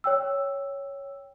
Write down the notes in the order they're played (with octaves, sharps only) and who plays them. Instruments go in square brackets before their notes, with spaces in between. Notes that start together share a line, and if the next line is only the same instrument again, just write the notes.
[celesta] C#5 G5 E6